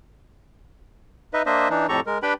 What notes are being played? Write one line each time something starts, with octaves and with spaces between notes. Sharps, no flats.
D#4 B4 D#5 E5
A#3 D4 C5 D#5 E5
E3 D4 D#4
F2 A2 G4 A4 A#5 C#6
G#3 A#4
D4 G4 B4 G5 B5